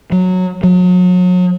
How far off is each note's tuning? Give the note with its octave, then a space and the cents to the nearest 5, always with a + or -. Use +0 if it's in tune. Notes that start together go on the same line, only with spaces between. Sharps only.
F#3 -10
F#3 -35